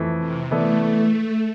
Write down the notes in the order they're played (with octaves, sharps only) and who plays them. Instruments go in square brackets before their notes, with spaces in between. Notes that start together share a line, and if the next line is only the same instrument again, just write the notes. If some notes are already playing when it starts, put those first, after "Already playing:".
Already playing: [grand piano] F2 E3 A3
[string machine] C3
[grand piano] E3 B3 E4 A4 D5 [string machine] A3